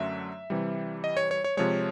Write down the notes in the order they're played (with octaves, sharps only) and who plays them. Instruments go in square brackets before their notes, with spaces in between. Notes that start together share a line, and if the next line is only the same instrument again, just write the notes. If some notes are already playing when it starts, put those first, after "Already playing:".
Already playing: [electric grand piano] F#2 D3 F#3 A3 C#4 E5
C3 E3 G3
D#5
C#5
C#5
C#5
C3 F3 G#3 C#5